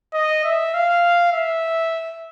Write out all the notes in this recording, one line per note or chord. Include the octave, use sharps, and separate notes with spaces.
D#5
E5
F5
E5